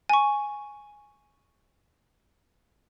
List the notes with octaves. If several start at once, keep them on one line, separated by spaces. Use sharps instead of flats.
G#5 C#6